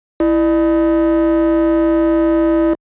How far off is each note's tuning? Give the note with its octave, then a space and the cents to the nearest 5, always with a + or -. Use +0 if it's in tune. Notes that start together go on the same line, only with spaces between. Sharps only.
E4 +0 D5 +45